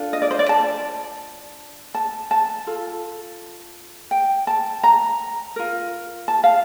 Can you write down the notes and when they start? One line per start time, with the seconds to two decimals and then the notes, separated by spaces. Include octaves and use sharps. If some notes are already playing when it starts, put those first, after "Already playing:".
Already playing: D4 F4 A4
0.13 D#5
0.22 D5
0.31 C5
0.39 D5
0.49 A5
1.94 A5
2.31 A5
2.67 F4 A4
4.11 G5
4.47 A5
4.83 A#5
5.56 F4 A#4
6.28 A5
6.44 F5